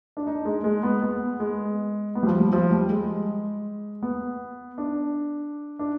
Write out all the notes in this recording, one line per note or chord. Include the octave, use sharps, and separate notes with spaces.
D4
D#4
G#3
G#3
B3
B3
G#3
B3
G3
F3
G3
F3
G3
G#3
B3
D4
D4